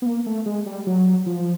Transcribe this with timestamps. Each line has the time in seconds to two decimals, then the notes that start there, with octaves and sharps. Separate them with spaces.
0.02 B3
0.06 A#3
0.26 A3
0.46 G#3
0.66 G3
0.87 F#3
1.26 F3